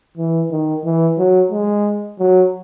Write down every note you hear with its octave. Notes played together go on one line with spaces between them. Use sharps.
E3
D#3
E3
F#3
G#3
F#3